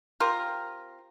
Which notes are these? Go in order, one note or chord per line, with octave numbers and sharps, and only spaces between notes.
C4 F4 G4 A#4